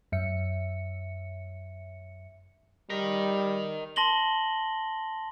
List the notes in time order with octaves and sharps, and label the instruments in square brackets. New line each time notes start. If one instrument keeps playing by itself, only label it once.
[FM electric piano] F#2 E5 C#7
[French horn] G3 [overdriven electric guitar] A#4 D#5
[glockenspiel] A5 C6 A#6 F#7 G7